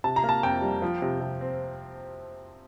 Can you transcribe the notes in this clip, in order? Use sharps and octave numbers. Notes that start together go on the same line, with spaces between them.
C3 A5
A#5
A#3
A5
F2 G5
G3
F3
C3
C3
C4